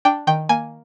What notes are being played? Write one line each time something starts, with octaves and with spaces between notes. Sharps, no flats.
D4 G5
D#3 G5
A#3 G#5